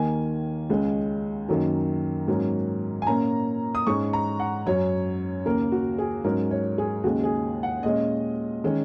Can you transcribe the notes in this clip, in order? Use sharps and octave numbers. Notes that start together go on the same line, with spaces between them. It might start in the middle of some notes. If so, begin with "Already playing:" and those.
Already playing: D#2 D#3 A#3 G#5
C#2 C#3 G#3 C#4
F#2 D#3 F#3 A#3
G#2 F#3 A#3 C#4
G#5
A#2 A#3 C#4 A#5
D#6
G#2 G#3 C#4 C#6
A#5
F#5
F#2 F#3 C#4 C#5
D#2 C#3 A#3 A#4
F#4
G#4
G#2 F#3 C#4 A#4
C#5
G#4
D#2 C#3 G#3 F#4
G#4
F#5
A#2 G#3 C#4 D#5
D#3 G#3 C#4